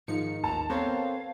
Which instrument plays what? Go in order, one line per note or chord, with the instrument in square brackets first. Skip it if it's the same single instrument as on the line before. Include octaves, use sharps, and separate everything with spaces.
[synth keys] G#2 F3 C#7 [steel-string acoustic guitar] D#3 [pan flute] D#4
[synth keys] A1 D#2 [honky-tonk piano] A5 [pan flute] A#5
[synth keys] B3 A4 A#4 [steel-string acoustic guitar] C4 C5 C#5 [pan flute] F5